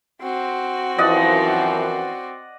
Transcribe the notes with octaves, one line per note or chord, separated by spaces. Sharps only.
C4 F#4
F#2 E3 F3 D5 D#5 F#5